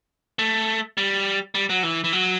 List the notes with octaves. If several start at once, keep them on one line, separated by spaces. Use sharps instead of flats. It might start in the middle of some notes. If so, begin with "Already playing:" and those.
A3
G3
G3
F#3
E3
E3
F#3